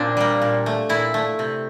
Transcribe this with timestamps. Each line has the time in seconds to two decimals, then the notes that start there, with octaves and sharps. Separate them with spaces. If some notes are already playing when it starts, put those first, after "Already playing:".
Already playing: A#2 C4 D4
0.17 G3 A#3
0.42 A#2
0.66 A3
0.89 A#2 E4
1.14 A3
1.39 C3